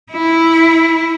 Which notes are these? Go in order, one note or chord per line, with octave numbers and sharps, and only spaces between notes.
E4